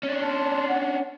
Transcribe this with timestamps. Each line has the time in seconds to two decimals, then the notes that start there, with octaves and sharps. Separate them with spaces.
0.03 C#4 D4
0.22 A5 C6
0.68 F#5